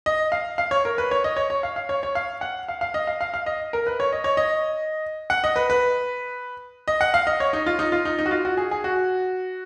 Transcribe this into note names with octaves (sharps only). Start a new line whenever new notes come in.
D#5
F5
F5
C#5
A#4
B4
C#5
D#5
C#5
C#5
F5
F5
C#5
C#5
F5
F#5
F5
F5
D#5
F5
F5
F5
D#5
A#4
B4
C#5
D#5
C#5
D#5
F#5
D#5
B4
B4
D#5
F#5
F5
D#5
C#5
D#4
F4
D#4
F4
D#4
D#4
F#4
F4
F#4
G#4
G#4
F#4